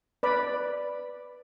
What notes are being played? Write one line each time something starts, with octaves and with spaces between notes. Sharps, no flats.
B4 D5 B5